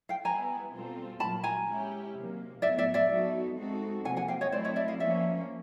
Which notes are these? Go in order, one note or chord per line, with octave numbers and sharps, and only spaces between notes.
F5 G5
G3 B3 E4 G#5 A#5
B2 G3 C4 F4 A4
A#2 F#3 A#3 A5 B5
G#5 A#5
G#3 C#4 E4 G4
C3 D#3 F#3 A#3
A2 F#3 B3 D5 E5
D5 E5
D5 E5
F#3 B3 D#4 F#4 A4
G#3 C4 D#4 F#4 A4
C3 F3 A#3 F#5 G#5
F#5 G#5
F5 G5
C#5 D#5
F#3 A3 C4 E4 C5 D5
C#5 D#5
D5 E5
D#5 F5
F3 A#3 C#4 D5 E5